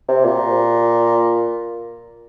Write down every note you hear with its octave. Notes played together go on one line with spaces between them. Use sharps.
C3
A#2